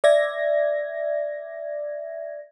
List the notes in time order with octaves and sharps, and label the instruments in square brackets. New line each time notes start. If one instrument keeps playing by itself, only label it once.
[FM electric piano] D5 E5 G#6 A#6